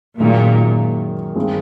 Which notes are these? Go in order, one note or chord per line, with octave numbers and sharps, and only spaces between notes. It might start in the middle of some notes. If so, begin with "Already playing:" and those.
F#2 A#2 D#3 G#3
G2 D#3 G#3 C4